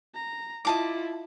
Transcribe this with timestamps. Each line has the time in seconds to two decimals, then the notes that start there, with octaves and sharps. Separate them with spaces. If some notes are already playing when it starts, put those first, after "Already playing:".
0.15 A#5
0.65 E4 F4 D#5 A5 D6